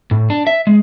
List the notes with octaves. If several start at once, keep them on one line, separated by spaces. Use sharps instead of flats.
A2
D4
E5
G#3